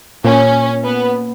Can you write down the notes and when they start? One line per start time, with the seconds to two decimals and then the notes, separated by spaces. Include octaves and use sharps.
0.24 A#2 C#4
0.85 B3